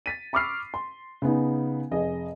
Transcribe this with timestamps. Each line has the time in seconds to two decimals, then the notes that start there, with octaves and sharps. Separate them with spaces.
0.06 A6 B6 D#7
0.33 B5 C#6 D6 E6 F6 C7
0.74 C6
1.22 C#3 B3 D#4
1.91 F1 G#4 D#5